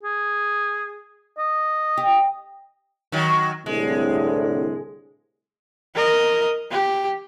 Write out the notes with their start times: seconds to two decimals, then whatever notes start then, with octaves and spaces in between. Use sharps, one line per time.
0.03 G#4
1.38 D#5
1.97 G4
3.12 D#3 F#3
3.66 C2 A2 D3 G#3
5.95 A#4 D#5
6.71 G4